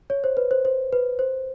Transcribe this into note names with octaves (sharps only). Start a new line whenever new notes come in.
C#5
C5
B4
C5
C5
B4
C5